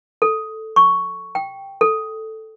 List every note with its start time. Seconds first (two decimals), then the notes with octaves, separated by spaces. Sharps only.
0.22 A4
0.76 C#6
1.35 G5
1.81 A4